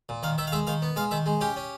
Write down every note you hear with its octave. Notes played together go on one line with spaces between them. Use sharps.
A#2
D#3 F5
D#3 E5
F5
G#3 E5
D#3 F5
B3
G#3 F5
D#3 E5
G#3
C#4 G4
C#4